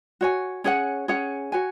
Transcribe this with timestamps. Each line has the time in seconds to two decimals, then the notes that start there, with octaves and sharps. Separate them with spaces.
0.21 F#4 C#5 G#5
0.64 C#4 G#4 C#5 F#5
1.08 C#4 G#4 C#5 F#5
1.52 F#4 C#5 G#5